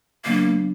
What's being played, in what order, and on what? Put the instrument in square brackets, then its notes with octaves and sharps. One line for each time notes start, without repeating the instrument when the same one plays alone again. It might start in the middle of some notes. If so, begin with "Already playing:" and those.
[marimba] C#3 F#3 B3 D4 [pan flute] A#3